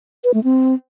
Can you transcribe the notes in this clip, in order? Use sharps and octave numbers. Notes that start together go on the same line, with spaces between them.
B4
A3
C4